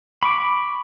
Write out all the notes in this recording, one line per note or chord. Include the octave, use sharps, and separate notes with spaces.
B5 C#6 D6